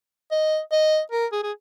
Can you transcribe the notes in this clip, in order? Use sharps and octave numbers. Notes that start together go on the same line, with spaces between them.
D#5
D#5
A#4
G#4
G#4